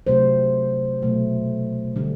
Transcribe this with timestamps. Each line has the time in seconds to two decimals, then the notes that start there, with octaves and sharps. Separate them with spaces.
0.07 C3 F#3 A3 C5
1.02 B2 F#3 A3
1.96 D3 G3